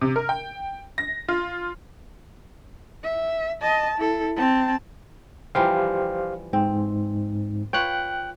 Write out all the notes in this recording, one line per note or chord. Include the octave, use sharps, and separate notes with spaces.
C3
A#4
G5
A#6
F4
E5
D#5 A5
E4 A4
C4 A5
E3 F3 G3 G4 C5 F5
G#2 C4
F4 B4 C#5 G5 F#6